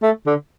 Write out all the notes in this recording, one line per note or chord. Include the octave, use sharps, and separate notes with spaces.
A3
D3